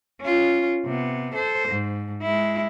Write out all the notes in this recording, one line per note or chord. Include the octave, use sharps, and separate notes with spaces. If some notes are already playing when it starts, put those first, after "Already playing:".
C#4 F4
C3 B3
A4 C5
G#2
G#3 E4